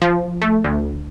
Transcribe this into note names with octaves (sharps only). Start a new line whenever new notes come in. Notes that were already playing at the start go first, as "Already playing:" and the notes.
F3
A3
D2